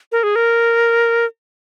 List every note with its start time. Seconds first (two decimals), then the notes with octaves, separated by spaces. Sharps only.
0.12 A#4
0.23 G#4
0.36 A#4